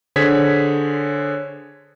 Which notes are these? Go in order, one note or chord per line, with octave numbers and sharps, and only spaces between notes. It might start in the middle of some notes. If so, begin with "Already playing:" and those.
D3 G#4 C5 C#5 G#6 B6